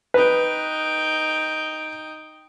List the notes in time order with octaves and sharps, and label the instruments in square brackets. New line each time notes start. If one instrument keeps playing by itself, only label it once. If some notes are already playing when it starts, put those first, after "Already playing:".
[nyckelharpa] D#4 G5 [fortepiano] B4